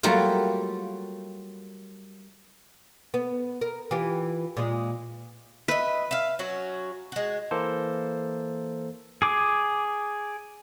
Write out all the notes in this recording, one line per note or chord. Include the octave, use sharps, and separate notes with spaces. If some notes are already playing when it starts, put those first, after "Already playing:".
F#3 G3 A3 A#3 F4
B3
A#4
E3 F4 G4
A#2 G#3
B4 D#5 E5
E5 F5
F#3 C#4 F#4
G#3 F#4
E3 A#3 A4 C5
G#4 D6